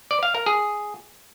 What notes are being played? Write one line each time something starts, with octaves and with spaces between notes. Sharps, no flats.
D5
F5
A#4
G#4